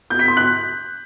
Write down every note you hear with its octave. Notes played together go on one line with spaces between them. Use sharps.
G6
B6
C6
F#6